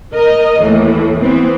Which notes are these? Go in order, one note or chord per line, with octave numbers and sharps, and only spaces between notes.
A#4 D#5
D#2 A2 E3
E3 B3 C4